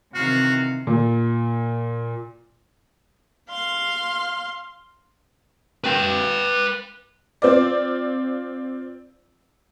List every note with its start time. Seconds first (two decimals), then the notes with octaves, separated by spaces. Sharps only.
0.15 C3 D#3 E3 F#4 F5
0.87 A#2
3.50 F5 C6
5.84 B4 G5
7.42 C4 F4 D5